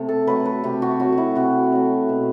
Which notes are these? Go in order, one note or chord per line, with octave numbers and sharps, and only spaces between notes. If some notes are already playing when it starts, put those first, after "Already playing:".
Already playing: C3 A3
A4
F#3 A3 B4
B4
C3 G4
F#4
F#3 A3 F#4
F#4
E4
C3 F#4
F#3 A3
B2